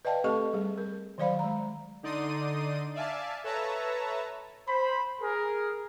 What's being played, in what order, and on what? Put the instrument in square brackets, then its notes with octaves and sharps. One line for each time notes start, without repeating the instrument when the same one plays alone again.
[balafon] B4 D5 D#5 F5 G5 A5
A3 C4 G4 A4 D#5 C#6
G3 G#4
A#4
D#3 F#3 C5 D5 F5 B5
G#3 A#5
[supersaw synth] D3 D#4 D5 C6 D#6 D#7
D5 E5 F5 G#5 A5
A4 B4 C#5 E5 A5 A#5
[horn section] C5 B5
G#4 A#4